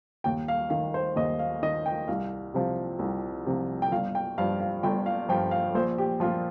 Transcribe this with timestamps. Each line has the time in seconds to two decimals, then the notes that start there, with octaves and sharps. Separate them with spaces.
0.24 D#2 G5
0.48 F5
0.70 D#3 F5
0.94 C5
1.16 D#2 D#5
1.39 F5
1.62 D#3 D#5
1.86 G5
2.08 C2 F5
2.54 C3 F3
2.99 C2
3.46 C3 F3
3.82 G5
3.92 G1 F5
4.15 G5
4.38 G2 F3 F5
4.60 F5
4.83 G1 G5
5.06 F5
5.29 G2 F3 G5
5.51 F5
5.74 A#1 C5
5.98 G4
6.20 F3 F4
6.25 A#2